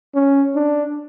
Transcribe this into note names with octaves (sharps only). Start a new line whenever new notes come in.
C#4
D4